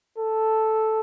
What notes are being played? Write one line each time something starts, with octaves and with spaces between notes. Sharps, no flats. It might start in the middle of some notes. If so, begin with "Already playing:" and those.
A4